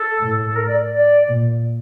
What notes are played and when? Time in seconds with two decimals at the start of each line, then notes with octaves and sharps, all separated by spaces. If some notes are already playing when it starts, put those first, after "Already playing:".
Already playing: A4
0.19 A2
0.43 A4
0.55 A#4
0.67 D5
0.91 D5
1.28 A#2